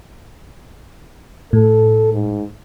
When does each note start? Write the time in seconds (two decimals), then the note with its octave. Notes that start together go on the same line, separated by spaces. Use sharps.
1.53 A2 A4
2.13 G#2